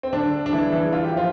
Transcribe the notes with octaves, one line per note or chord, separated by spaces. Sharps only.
C4
D3 D4
D4
E3 E4
E3 E4
F4
G4
F3 F4